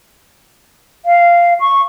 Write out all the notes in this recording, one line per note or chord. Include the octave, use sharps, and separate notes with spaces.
F5
C#6